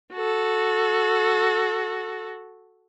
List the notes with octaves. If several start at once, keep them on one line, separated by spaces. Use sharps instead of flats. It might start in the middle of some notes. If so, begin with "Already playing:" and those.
F#4 A4